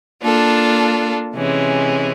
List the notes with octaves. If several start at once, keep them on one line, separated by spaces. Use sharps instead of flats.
A#3 D4 F4 A4
C3 E3 G#3 C#4